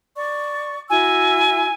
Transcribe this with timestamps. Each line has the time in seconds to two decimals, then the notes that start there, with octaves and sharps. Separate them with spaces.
0.16 D5 C#6
0.90 E4 F#4 G#5 E6